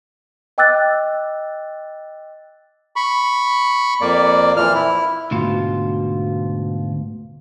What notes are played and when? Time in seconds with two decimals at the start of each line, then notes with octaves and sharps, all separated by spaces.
0.58 D#5 G5 D6 E6 F#6 A6
2.96 B5 C#6
4.01 F2 A#3 D5
4.57 A#2 E3 F3 F6
4.74 E4
5.31 D2 G#2 B2 F4